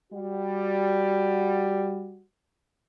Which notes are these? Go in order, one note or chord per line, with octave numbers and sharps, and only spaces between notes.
G3 F#4